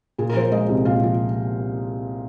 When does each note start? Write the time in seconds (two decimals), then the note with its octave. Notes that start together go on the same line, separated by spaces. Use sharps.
0.18 A#2 G#4
0.29 A#4
0.35 F3 C5
0.41 A#4
0.52 G#3 D#5
0.69 C2
0.85 A#2 F5
1.03 F3